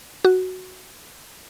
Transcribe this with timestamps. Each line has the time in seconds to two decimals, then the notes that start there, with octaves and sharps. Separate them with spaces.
0.25 F#4